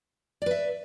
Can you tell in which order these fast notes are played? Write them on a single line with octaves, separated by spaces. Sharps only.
D5 B4 E5